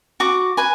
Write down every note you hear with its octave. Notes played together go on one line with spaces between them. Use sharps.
F#4 D6
B4 G#5